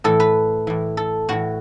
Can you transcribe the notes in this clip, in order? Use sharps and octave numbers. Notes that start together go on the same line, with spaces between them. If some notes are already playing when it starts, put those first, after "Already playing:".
A2 E3 A4
B4
A2 E3
A4
A2 E3 F#4